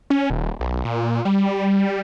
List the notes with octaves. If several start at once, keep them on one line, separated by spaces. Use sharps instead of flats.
C#4
D#1
B1
A#2
G3